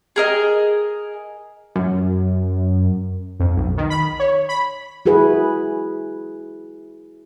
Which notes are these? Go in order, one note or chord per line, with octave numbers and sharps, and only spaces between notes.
G#4 A#4 D#5 G#5
F#2
F2
B1
D#3
B5
C#5
B5
E4 F#4 G#4 B4